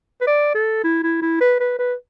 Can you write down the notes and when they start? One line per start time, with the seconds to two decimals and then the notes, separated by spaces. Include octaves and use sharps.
0.21 B4
0.27 D5
0.55 A4
0.84 E4
1.03 E4
1.22 E4
1.41 B4
1.60 B4
1.79 B4